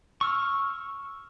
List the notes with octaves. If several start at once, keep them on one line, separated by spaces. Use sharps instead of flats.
C#6 E6 F6